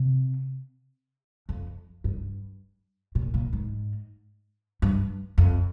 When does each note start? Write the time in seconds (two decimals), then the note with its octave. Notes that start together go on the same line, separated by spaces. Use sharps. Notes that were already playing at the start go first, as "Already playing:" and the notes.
Already playing: C3
1.49 F2
2.04 G2
3.15 A#2
3.34 A#2
3.53 G#2
4.82 G2
5.38 F2